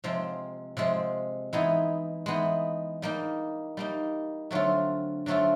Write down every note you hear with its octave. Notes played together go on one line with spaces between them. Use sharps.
C3 F3 G#3 C4
C3 F3 G#3 C4
E3 G#3 B3 D#4
E3 G#3 B3 D#4
G3 A#3 D#4
G3 A#3 D#4
D3 F#3 A3 C4 F4
D3 F#3 A3 C4 F4